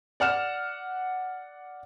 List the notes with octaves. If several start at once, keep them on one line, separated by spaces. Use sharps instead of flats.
D5 F#5 F6 E7